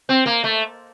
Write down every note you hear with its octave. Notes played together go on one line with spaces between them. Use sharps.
C4
A#3
A3